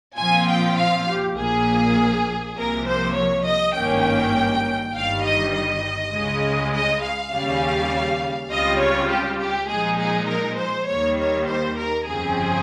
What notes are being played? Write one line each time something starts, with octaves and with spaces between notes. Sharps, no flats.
A#2 F3 C4 F4 G#5
G5
F5
G4
A#1 A#2 F3 A#3 G#4
C2 C3 F3 A#3 A#4
C5
C#5
D#5
G#1 G2 D#3 A#3 C#4 G5
G1 G2 D#3 G3 F5
D#5
D#5
C#2 C#3 G#3
D#5
F5
D#2 C#3 G3 C#4
C#2 C#3 G3 C4 F4 D#5
C#5
G4
G4
A#2 F3 G#3 D#4 G#4
G#4
A#4
C5
D#2 D#3 G3 A#3 C#5
C#5
C5
A#4
G1 F2 C#3 F3 C4 G#4